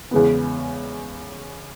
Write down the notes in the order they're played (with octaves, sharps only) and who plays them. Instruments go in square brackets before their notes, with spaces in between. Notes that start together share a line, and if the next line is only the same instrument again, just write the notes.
[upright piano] E2 C#3 G#3 B3